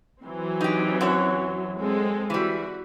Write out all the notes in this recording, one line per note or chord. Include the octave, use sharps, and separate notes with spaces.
E3 F#3 C4
D#4 G4
F#2 F#4 C#5
G#3 C4 A4
E3 G3 F#4